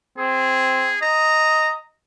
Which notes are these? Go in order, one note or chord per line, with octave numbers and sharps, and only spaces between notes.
C4 G#4
D#5 A#5